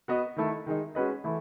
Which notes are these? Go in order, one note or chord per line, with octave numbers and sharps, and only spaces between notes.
B3 F#4 B4 D#5
D#3 A3 E4 A4
D#3 G#3 D#4
G#3 C#4 F#4 B4 D#5
E3 A3 E4